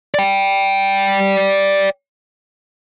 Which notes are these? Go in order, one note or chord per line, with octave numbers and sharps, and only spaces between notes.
D5 G5